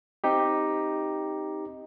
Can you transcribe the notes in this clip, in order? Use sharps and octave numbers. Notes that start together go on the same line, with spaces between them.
C4 D#4 G4